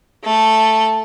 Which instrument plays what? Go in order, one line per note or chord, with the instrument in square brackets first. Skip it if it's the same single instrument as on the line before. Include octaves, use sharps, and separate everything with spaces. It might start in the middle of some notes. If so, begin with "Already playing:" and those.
[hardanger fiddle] A3 A5